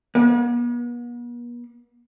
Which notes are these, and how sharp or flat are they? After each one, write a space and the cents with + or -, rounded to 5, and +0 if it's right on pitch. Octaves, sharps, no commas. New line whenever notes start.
B3 -45